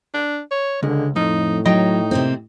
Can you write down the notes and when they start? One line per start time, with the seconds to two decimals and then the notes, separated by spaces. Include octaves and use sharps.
0.14 D4
0.51 C#5
0.83 C#2 D3 G#3
1.16 F2 A2 D#4
1.66 F#3 D#4 D#5 G5 A#5
2.11 C3 A#3 C4